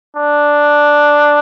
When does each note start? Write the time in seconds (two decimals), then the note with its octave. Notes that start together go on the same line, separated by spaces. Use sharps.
0.16 D4